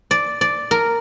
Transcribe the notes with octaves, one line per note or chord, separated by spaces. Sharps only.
D5
D5
A#4